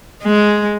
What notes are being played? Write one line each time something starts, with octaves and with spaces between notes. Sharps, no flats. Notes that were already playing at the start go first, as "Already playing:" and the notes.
G#3